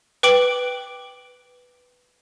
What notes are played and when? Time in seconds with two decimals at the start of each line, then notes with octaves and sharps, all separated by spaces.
0.23 B4 G5 D6 D7 F#7